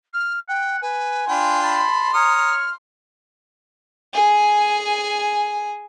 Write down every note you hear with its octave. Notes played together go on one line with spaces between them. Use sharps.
F6
F#5 G5
B4 G#5
D4 F4 G5 B5 C6
A5 B5
C#5 A#5 D#6 F6
G#4 G#5